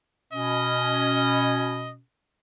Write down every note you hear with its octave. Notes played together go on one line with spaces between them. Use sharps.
B2 C#4 D#5